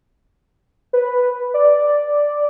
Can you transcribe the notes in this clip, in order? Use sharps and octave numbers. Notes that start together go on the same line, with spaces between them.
B4
D5